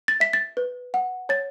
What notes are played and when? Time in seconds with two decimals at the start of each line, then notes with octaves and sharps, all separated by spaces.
0.08 A6
0.20 E5 B6
0.33 A6
0.57 B4
0.94 F#5
1.29 C#5 A6